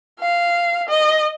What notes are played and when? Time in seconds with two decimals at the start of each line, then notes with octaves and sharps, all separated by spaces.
0.20 F5
0.89 D#5